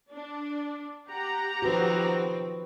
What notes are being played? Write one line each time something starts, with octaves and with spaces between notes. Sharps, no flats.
D4
G4 F#5 A#5
D#3 F3 C4 F#4 B4